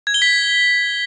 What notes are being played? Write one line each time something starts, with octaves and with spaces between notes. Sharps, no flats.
G#6
G7
B6